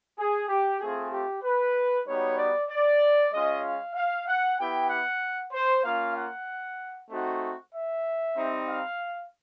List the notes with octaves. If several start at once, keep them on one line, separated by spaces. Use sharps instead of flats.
G#4
G4
A3 C4 F4 G#4
G4
B4
G3 B3 D#4 F#4 C#5
D5
D5
G#3 C#4 F4 D#5
F5
F5
F#5
B3 E4 G4 G5
F#5
C5
A#3 C#4 F4 F5
F#5
A3 C4 D#4 F#4
E5
G3 C4 D#4
F5